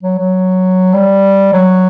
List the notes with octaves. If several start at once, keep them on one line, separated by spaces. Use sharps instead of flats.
F#3
F#3
G3
F#3